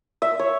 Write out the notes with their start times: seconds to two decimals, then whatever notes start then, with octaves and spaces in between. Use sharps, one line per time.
0.22 E5
0.39 C#5